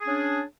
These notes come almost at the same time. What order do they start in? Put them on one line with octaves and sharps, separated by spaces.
G#4 C#4 D4